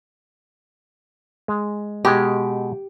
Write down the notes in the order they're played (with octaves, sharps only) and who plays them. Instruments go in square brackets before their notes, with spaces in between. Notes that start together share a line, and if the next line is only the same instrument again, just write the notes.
[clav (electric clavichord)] G#3
[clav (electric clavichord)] B2 G#3 [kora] G4